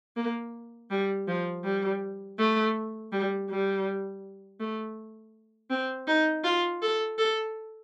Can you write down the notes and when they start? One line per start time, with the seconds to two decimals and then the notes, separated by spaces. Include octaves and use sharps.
0.16 A#3
0.91 G3
1.28 F3
1.64 G3
2.39 A3
3.12 G3
3.50 G3
4.60 A3
5.70 C4
6.07 D#4
6.44 F4
6.82 A4
7.18 A4